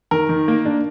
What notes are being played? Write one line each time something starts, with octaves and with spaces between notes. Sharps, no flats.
D#3 A#4
D#3
A#3
D4